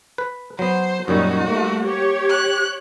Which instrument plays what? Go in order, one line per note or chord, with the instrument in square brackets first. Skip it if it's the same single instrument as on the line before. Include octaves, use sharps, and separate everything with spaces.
[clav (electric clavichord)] B4
[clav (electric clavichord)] F#3 B3 [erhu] C5
[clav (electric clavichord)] F#2 A#2 G3 [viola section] C#4 D#4 [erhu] F#4
[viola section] G3 A3 [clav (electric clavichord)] A#3
[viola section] G4 C#5
[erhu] F#6